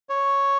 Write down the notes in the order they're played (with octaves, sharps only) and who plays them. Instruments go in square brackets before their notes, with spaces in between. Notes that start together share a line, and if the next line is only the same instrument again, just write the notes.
[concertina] C#5